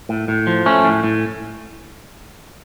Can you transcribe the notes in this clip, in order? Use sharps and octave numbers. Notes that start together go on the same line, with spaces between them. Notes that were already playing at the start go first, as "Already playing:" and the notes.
A2
A2
F3
A3 C#4
A2
A2